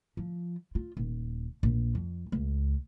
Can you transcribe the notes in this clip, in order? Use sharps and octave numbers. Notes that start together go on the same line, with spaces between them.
F3
F4
D#1
A#1
F2
C#2